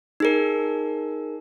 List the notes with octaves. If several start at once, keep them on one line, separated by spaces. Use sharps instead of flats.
D#4 G#4 A#4